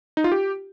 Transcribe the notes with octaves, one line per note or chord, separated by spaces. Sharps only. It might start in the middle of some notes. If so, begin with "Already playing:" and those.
D#4
F4
G4